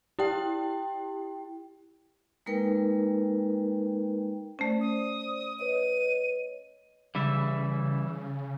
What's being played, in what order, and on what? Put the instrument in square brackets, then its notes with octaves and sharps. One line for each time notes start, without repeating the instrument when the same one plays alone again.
[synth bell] E4 G4 G5
[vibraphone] G#3 A#3 D#4 A#4 B4 G5
[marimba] A3 C#4 [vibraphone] C5 D5
[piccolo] D#6
[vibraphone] B4 C#5 D#5 [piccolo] D#7
[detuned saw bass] C#3 [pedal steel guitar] E3 G3 E5